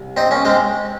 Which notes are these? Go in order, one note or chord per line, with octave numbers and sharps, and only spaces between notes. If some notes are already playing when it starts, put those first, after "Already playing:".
Already playing: C2
C4 D#4
A#3 C#4
G#3 C4